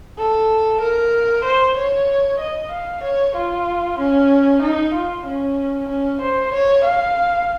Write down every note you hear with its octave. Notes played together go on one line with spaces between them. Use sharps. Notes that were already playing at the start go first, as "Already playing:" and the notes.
A4
A#4
C5
C#5
D#5
F5
C#5
F4
C#4
D#4
F4
C#4
C#4
C5
C#5
F5